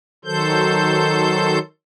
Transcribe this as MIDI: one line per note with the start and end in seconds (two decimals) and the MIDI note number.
0.25 1.59 51
0.25 1.59 54
0.25 1.59 69
0.25 1.59 72
0.25 1.59 91